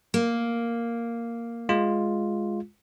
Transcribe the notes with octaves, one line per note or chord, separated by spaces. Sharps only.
A#3
G#3 F4